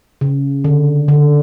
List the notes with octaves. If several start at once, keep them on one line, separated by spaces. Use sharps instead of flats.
C#3
D3
D3